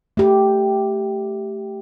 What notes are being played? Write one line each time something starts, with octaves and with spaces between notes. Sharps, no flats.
A3 G4